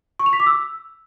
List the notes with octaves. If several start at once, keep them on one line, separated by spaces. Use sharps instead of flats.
C#6
F7
B6
D6
E6